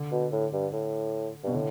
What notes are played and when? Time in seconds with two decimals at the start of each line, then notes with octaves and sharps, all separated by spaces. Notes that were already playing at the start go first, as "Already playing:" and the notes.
Already playing: D3
0.12 B2
0.32 A2
0.53 G2
0.72 A2
1.43 G2 B2
1.54 A2 D3